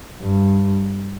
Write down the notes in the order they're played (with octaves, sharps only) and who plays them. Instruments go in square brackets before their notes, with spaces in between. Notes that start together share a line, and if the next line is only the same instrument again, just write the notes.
[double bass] G2